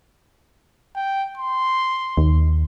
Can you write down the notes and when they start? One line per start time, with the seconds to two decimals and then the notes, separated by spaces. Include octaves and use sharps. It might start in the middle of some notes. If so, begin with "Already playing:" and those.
0.95 G5
1.38 C6
2.17 D#2